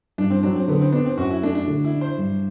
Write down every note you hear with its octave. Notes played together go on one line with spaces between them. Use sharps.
G2 D4
C4
F#3 D4
C4
D3 B3
C4
B3 D4
C4
F#2 F#4
E4
A3 D4
D4
D3
E4
D4
C5
G2